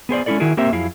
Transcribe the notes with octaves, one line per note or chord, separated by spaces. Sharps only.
B3 G#4 C5 D5
G#3 C#4 D4 E4 A4 D5
D#3 E4 F#4 G#4 A#4
A#3 C4 G4 A#4 C5 E5
F2 F#3 E4 G#4 F5